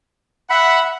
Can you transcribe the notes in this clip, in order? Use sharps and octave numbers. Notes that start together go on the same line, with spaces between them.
E5 F#5 B5